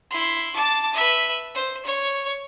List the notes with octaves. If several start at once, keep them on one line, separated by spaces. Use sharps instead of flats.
E4 C6
A5 D6
B4 E5
C5
C#5